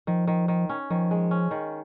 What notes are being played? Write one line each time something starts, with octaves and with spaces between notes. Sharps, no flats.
D#3 F3
D#3
D#3
C#4
D#3 F3
G#3
C#4
D#3